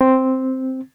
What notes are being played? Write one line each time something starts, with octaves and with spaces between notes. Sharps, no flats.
C4